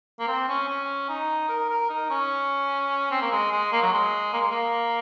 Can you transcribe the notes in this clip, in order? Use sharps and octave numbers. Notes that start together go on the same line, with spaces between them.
A#3
C4
C#4
C#4
D#4
A#4
A#4
D#4
C#4
C4
A#3
G#3
G#3
A#3
F#3
G#3
A#3
G#3
A#3